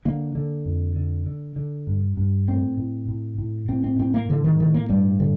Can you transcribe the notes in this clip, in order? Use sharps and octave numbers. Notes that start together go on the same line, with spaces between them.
D3 A#3
D3
F2
D3
D3
D3
G2
G2
A2 C4
A2
A2
A2
A2 C4
C4
A2 C4
A#3
A2 D3
D#3
A2 D#3
A#3
G2 G3
D3